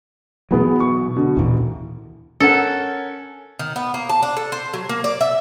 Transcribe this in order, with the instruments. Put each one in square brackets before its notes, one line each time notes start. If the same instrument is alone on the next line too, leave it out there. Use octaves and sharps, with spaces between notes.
[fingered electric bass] B2 F#3 [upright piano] E3 B3 G#4
[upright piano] C#6
B2 D3
[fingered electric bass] D#2 A#2 A#3 [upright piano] E3
[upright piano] C#4 A#4 F#5 [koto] A4
[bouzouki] D#3
B3
A#3
A5
D4
A4
C5
F#3
A#3
D5
E5